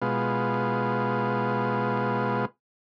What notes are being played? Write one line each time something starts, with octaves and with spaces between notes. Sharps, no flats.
B2 G#3 B3 F4